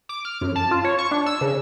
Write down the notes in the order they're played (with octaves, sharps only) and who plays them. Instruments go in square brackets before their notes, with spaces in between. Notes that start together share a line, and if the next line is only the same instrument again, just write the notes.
[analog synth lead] D6
F6
F#2
A5
F4
C#5
C#6
D4
E6
C#3